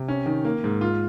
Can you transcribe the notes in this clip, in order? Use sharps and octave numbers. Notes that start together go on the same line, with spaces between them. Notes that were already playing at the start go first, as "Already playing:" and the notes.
Already playing: C3
C#4
D#3
A#3
G#2
F4